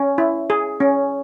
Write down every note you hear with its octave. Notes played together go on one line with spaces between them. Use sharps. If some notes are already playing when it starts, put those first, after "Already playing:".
Already playing: C#4
E4
G#4
C#4